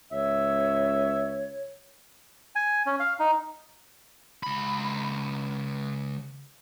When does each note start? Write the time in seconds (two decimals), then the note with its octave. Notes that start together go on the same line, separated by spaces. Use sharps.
0.12 C#2 C#5 E5
2.56 G#5
2.86 C#4
3.00 F5
3.20 D#4
4.43 C#2 B5